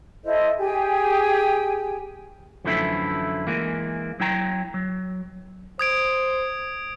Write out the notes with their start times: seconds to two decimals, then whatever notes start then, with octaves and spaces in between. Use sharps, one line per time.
0.25 E4 A4 C5 D#5
0.59 G4 G#4 G5 G#5
2.65 F#2 D3 E3 F3 A3 E4
3.47 E3 G#3 A#3
4.20 F#3 E4 G5 A#5
4.74 F#3
5.79 C5 D#6 G#6 D7